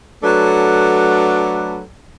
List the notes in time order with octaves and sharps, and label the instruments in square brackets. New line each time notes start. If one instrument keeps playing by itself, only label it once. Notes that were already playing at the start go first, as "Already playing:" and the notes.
[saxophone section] F#3 A3 D4 F#4 A4 B4